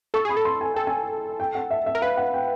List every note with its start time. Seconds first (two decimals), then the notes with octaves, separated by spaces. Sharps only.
0.14 A4 C#6
0.25 G#4 B5
0.37 A4
0.45 C6
0.61 G#5
0.74 A4 G5
0.87 G#5
1.40 G5
1.55 F#5
1.71 E5
1.86 E5
1.95 A#4
2.02 B4 F5
2.17 F#5
2.34 G5